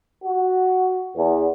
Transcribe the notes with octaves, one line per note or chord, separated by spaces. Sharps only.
F#4
E2